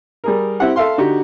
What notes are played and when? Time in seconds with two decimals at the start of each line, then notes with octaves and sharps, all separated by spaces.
0.24 G3 G#4 A#4
0.60 C4 E4 G4 F#5
0.76 A4 E5 F5 C6
0.98 D3 D#4 F#4 G4